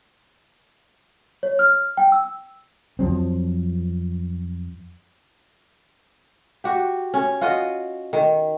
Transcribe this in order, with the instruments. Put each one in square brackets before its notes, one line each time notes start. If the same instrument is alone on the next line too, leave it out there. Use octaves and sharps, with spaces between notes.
[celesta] C#5
F6
G5
E6
[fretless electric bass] F2 F3 F#3 C4
[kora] F#4 G4
C#4
F4 F#4 D#5
D#3